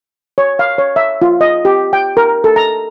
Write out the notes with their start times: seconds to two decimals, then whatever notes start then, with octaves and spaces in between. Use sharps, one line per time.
0.38 C#5
0.59 F5
0.78 C#5
0.96 E5
1.22 F4
1.41 D#5
1.65 G4
1.93 G5
2.17 A#4
2.44 A4
2.56 A#5